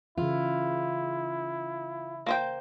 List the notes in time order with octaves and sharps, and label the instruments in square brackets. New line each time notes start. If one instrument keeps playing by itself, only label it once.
[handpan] C#3 E3 [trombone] E4 [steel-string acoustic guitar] F4
[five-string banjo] A#3 C5 G5